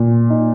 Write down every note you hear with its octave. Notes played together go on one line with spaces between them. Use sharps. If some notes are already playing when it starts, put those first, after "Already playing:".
Already playing: A#2
D#4